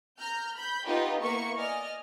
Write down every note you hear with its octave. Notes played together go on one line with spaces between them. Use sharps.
A#5 F6 G6
B5 G6
B3 D#4 F4 G4 B4 D#5
A#3 B3 E4 B4 C#6 C#7
D5 D#5 G#5 F6